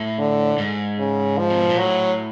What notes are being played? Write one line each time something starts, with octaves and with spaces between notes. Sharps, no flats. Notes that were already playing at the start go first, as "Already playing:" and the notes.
Already playing: A2
D3
G#2
C#3
F3
C3
B2
A#2
A2 F#3